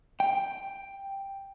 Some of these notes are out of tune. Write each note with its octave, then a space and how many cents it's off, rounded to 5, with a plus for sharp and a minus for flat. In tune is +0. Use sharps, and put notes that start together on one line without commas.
G5 +5